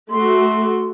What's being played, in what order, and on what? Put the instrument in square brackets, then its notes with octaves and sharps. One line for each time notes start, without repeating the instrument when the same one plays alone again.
[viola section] A3 F#4 [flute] C6